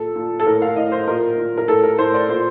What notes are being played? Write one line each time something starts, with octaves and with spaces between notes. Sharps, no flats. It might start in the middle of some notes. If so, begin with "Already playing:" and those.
Already playing: A#2 A4
A#2
A4
A2 A#4
F5
A2 D#5
C5
A#2 A#4
A#2
A#4
A2 A4
A#4
A2 C5
D5
A#2 C5